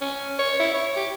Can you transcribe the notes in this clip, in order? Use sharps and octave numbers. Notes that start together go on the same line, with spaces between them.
C#4
C#5
E4
C#5
G4